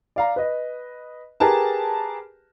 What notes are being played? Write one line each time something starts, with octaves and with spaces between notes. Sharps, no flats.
D5 F5 A#5
B4 D#5
G4 G#4 A#4 B4 A5